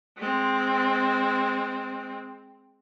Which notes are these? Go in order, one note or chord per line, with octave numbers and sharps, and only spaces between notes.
G#3 C4